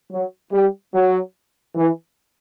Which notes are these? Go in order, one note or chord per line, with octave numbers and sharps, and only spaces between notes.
F#3
G3
F#3
E3